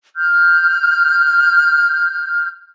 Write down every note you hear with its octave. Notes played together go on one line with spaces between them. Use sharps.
F6 G6